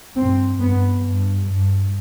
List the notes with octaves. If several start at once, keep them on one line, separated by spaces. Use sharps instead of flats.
G2 C4
G2 B3
G2
G2